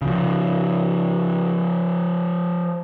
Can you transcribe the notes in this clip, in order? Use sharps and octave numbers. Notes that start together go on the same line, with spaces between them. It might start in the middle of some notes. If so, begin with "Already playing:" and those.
C#3 F3